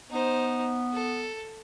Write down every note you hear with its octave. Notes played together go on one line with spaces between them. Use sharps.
B3 D#4 C5
A4